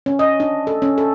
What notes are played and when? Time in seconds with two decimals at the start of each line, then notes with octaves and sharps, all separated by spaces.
0.06 C#4
0.19 D#5
0.40 D4
0.67 A4
0.82 C#4
0.98 A4